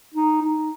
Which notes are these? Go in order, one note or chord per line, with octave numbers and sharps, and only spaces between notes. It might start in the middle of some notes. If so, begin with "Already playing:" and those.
D#4
D#4